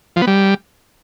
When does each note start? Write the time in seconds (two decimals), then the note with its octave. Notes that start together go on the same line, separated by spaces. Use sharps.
0.16 F3
0.22 B3
0.27 G3